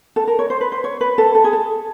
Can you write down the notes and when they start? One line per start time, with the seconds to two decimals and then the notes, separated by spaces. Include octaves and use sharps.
0.16 A4
0.27 A#4
0.39 C#5
0.50 C5
0.61 B4
0.72 C5
0.84 C#5
1.01 B4
1.18 A4
1.35 A4
1.44 G#4
1.53 A4